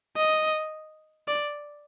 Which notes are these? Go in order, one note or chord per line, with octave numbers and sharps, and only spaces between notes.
D#5
D5